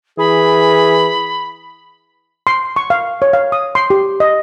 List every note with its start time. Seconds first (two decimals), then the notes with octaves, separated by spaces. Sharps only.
0.18 E3 G#4 B5
2.47 C6
2.76 C#6
2.90 F5
3.22 C#5
3.33 F5
3.52 D#6
3.75 C6
3.90 G4
4.20 D#5